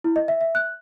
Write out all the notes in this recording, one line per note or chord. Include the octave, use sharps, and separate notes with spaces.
E4
D#5
E5
E5
F#6